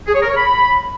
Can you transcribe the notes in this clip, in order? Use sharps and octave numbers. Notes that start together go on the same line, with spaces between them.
G#4
C#5
A#4
C#5
B5